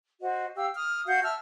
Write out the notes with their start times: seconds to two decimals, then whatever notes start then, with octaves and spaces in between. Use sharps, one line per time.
0.21 F#4 C5 D#5
0.56 G4 F5 E6
0.75 D#6 F6
1.07 F#4 F5 F#5 G6
1.23 E5 A5 E6 F6